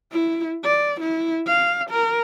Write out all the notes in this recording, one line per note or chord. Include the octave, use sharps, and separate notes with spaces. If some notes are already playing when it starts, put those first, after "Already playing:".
E4
D5
E4
F5
A#4